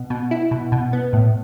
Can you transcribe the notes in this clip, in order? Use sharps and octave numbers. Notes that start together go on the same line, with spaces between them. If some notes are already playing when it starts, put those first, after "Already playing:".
Already playing: B2
B2
E4
B2
B2
B3
A2